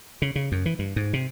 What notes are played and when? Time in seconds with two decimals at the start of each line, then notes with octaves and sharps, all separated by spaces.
0.22 C#3
0.36 C#3
0.52 F#2
0.66 E3
0.79 G2
0.96 G#2
1.13 C3